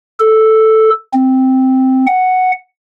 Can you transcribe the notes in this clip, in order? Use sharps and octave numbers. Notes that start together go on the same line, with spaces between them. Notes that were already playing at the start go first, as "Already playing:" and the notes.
A4
C4
F#5